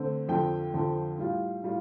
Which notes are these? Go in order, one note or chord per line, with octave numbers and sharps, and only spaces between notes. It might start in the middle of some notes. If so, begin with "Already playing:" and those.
Already playing: D3 A3 C4
F2 D3 F3 G5
F2 D3 F3
A2 G3 F4
A2 G3 F4